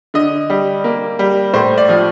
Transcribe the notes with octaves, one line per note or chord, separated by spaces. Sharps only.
D3 D#5
G3
A#3
G3
A2 C5
D5
F3